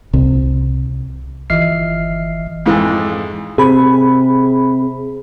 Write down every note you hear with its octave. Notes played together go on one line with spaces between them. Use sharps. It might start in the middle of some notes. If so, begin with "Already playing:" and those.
C2 C3
G1 E3 D#5 E5 F6 C7
F2 G#2 E3
C3 G#4 B5